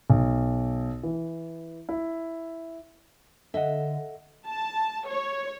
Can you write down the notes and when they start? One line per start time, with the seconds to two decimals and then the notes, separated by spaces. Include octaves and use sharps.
0.10 B1
1.03 E3
1.89 E4
3.54 D3 A4 D#5 E5 F#5
4.46 A5
5.08 C#5